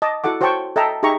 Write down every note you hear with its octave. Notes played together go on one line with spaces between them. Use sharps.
D#5 A5 D6
E4 F#4 A4 F#5 D6
F#4 C5 C#5 G5 A5 C#6
A4 D#5 E5 G5 A5 A#5
D#4 G4 G#4 E5 A#5 C#6